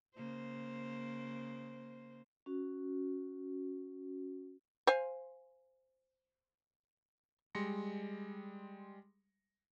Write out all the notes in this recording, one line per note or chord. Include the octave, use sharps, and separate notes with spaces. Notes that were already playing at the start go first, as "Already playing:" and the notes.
C#3 A#3 C5
C#4 F#4
C5 F5 G#5
G3 G#3 C6 A#6 C#7